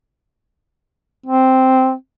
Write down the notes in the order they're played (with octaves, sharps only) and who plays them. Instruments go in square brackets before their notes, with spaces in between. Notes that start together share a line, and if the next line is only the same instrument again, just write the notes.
[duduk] C4